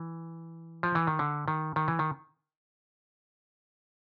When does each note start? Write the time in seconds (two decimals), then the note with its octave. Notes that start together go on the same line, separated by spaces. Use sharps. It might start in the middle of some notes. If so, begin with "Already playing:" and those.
Already playing: E3
0.83 F3
0.95 E3
1.07 D#3
1.19 D3
1.48 D#3
1.76 D#3
1.88 E3
1.99 D#3